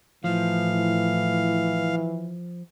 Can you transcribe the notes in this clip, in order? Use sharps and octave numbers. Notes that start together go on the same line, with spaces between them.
A2 E3 F3 F5